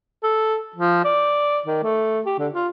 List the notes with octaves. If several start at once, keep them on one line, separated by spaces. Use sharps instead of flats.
A4
F3
D5
D#3
A3
G4
D3
F4